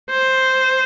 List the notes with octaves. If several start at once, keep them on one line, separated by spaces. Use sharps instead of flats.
C5